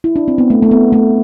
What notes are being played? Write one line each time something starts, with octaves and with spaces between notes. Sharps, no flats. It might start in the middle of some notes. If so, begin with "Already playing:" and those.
E4
D4
C4
B3
A3
A3
B3
A3